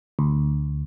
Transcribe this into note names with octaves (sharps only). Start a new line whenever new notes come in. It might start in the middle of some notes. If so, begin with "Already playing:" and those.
D2